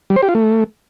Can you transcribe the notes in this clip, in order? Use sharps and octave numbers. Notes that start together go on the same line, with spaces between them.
G3
C5
G4
F4
A3